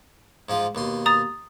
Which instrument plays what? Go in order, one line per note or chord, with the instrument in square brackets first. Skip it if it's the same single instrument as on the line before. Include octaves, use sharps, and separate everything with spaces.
[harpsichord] G#2 F3 F4
D#2 B2 C6
[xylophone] A#5 D#6 A6